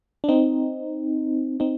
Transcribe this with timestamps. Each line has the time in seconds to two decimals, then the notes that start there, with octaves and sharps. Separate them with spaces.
0.24 D4
0.29 C4 D#4
1.60 C4 D#4